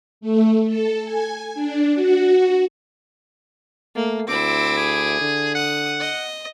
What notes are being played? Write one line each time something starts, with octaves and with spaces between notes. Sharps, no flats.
A3
A4
G#5
D4
F#4
A3 A#3
D2 C4 E4 D6
G#4
D3
F#5 D#6
D#5